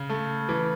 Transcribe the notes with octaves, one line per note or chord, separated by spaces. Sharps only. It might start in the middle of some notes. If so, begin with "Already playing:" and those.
Already playing: C#3
A3
E3